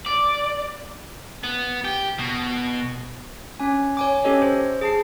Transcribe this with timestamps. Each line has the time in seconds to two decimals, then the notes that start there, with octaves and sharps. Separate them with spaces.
0.06 D5
1.44 B3
1.84 G4
2.19 B2
3.60 C#4 G#5
3.97 C#5 G#5 D6
4.24 C#4 G4 A4 C#5 D#5
4.42 C5
4.81 G#4 A5 C7